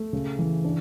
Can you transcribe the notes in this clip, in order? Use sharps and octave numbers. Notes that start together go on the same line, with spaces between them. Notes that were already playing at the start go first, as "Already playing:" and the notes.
Already playing: A3 A4
C#3
E3
D4